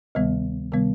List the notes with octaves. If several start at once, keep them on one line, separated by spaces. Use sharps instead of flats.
D2 C3 D#3 G3 B3
C3 D#3 G3 B3